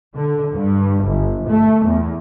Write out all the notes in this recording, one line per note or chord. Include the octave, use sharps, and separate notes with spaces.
D3
G2
G1
A3
E2